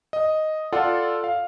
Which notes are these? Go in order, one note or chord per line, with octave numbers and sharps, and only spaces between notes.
D#5
F4 A4 D5 F#5
F5